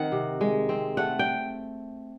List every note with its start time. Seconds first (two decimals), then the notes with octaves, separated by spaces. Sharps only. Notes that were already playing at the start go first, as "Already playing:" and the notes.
Already playing: D#3 C4 F#5
0.12 C3
0.41 G#3
0.69 C4
0.97 A3 F#5
1.19 G5